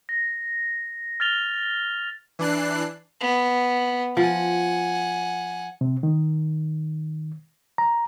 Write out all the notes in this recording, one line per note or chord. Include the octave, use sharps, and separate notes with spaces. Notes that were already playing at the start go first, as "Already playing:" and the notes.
A#6
F6 A6 F7 G7
E3 D4 F#6 C7
B3
F3 F#5 G#5
C3
D#3
A#5